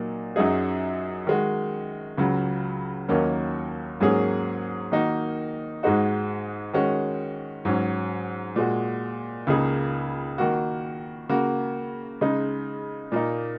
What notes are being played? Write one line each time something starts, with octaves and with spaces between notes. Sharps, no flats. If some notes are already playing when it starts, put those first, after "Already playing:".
Already playing: A#2 F#3 A#3 D#4
F#2 F#3 D#4 G#4
D#3 G#3 F#4
C#2 C#3 F#3
D#2 D#3 F#3 A#3 C#4
G#2 F#3 A#3 C#4 G#4
D#3 A#3 D#4 F#4
G#2 G#3 D#4 F#4
D#3 G#3 C#4 F#4
G#2 F#3 C#4
A#2 G#3 F#4
C#2 C#3 A#3 D#4 G#4
D#3 A#3 F#4
C#3 A#3 F#4
C#3 G#3 D#4
A#2 A#3 D#4